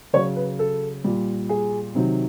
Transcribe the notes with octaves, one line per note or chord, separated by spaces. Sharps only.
C#3 F#3 C#5
B4
A4
A#2 G3
G#4
C3 D#3 F#3